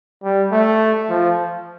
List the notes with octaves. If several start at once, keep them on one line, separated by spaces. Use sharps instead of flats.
G3
A3
F3